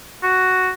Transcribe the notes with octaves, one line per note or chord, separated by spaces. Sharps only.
F#4